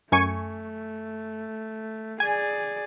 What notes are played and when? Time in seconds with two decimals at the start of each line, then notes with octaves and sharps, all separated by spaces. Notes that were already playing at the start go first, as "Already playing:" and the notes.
0.12 F#2 A3 G#5 C#6
2.20 G#4 D5 G#5